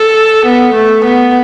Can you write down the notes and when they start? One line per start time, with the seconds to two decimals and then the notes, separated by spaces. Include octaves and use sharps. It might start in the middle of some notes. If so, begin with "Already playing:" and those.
Already playing: A4
0.46 B3
0.75 A3
1.05 B3